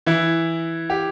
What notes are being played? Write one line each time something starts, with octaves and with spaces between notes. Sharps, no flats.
E3 E4
G4